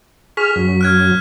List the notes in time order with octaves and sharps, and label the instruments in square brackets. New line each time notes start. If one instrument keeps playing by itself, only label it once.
[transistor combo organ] G#4 F6 [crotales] C#6 B6
[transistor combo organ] F#2
[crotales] F6 F#6 G#6